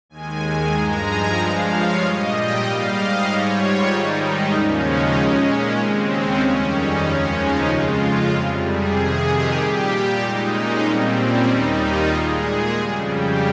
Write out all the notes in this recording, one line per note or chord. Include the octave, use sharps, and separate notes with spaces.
D#2 D#3 G#3 G#5
G#5
G2 F3 G#3 A#5
G#5
G2 F3 G#3 F5
C#5
A#2 G3 D#5
G5
G#2 G3 F5
D#5
G#2 G3 C#5
F4
G#2 D#3 G3 D#4
D#2 C#3 F3 G#3 C#4
D#4
A#2 G#3 C#4
C#4
D#2 C#3 G#3 C4
C#4
F2 D#3 G3 C#4
D#4
D#2 C#3 F3 G#3 C#4
D#4
F2 C#3 G#3 F4
F2 C3 G3
G#4
F2 C3 D#3
G4
A#2 G3
A#2 G#3 D#4
C#4
A#2 G3 C4
C#4
D#2 D#3 G3 D#4
F4
A#2 G#3 G#4
F2 C#3 G3
G4